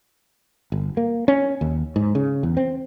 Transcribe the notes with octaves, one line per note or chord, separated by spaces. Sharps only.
G1
A#3
C#4
D#2
G#2
C#3
E2
C4